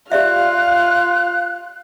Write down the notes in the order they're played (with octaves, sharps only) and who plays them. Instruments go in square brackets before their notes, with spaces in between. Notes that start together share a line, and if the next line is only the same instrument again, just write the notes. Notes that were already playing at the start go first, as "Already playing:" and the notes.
[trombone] F4 [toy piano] G4 D5 E5 [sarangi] F5 [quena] F#6